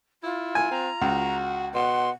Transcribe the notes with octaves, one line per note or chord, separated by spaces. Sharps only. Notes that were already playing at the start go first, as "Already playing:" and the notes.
E4 F4
G#5
C4 A#5
C#2 F#4
B2 F#5 C6